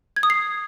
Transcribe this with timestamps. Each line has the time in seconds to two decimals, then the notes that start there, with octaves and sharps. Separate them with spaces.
0.16 G#6
0.23 D#6
0.30 C7